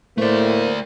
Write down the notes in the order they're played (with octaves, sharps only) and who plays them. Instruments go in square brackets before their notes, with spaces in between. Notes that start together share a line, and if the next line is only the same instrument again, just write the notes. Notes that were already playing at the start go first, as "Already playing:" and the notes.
[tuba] A2 [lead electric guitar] A3 D5 [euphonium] A#3 [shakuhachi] C5